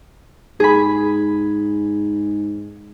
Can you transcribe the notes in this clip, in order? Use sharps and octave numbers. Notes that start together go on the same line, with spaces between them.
G#2 G#4 B5